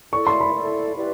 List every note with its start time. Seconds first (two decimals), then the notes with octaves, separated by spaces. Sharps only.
0.12 E4 A4 D5 C#6
0.27 C6
0.41 B5
0.54 E4 A4 D5
0.96 E4 G4 B4 D5